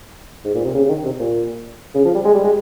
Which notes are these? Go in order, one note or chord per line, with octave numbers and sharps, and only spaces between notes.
G#2
A#2
C3
C#3
C#3
D#3
C3
A#2
C#3
F3
G3
G#3
G3
G#3